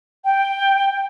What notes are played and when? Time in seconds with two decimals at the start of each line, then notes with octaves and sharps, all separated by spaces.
0.24 G5